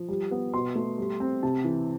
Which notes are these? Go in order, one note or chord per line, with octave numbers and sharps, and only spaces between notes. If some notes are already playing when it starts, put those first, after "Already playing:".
Already playing: F3
G3
B3
B2 C6
A3
G3
C4
C3 A5
E3